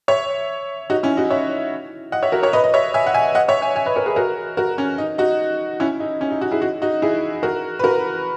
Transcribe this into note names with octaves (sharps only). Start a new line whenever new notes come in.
C#5 E5
D#4 F#4
C#4 E4
D#4 F#4
C#5 E5
D#5 F#5
C#5 E5
F#4 A#4
A#4 C#5
B4 D#5
D#5
C#5 E5
E5 G#5
F#5
E5 G#5
D#5 F#5
C#5 E5
E5 G#5
E5 G#5
B4 D#5
A#4 C#5
G#4 B4
F#4 A#4
F#4 A#4
C#4
D#4
D#4 F#4
C#4 E4
D#4
C#4
D#4
D#4 F#4
E4 G#4
D#4 F#4
D#4 F#4
E4 G#4
F#4 A#4
B4
F#4 A#4